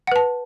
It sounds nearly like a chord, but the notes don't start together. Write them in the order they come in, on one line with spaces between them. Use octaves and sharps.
F#5 B4 A5